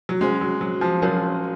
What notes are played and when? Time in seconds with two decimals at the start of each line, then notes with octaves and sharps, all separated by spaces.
0.09 F#3
0.21 G#3 C#4 F#4 C5
0.41 F#3
0.61 F#3
0.81 F3
1.02 F3 F#3 C#4 F#4 A#4 C#5